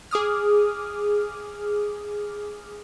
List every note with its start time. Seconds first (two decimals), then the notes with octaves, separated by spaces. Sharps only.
0.11 G#4 D6 D#6 F6